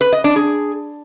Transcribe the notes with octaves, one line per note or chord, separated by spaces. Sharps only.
B4
D#5
D4
G#4